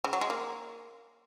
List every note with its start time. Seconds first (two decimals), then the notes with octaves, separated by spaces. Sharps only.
0.04 C#3
0.13 F#3
0.21 G#3
0.30 A#3